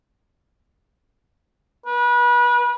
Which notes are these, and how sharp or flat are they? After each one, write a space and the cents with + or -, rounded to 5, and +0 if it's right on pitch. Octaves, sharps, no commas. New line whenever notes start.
B4 -30